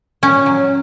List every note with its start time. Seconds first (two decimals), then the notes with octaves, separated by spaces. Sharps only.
0.23 A#2 C#4
0.46 F#3